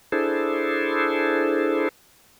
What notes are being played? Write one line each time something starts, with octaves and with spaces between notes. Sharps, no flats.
D4 E4 G#4 A4 C5